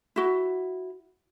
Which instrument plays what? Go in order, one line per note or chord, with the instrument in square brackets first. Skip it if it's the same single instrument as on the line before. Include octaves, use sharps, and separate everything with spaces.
[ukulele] E4 F#4